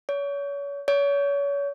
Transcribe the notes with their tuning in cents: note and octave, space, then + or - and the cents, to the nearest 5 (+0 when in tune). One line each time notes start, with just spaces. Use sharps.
C#5 +35
C#5 +35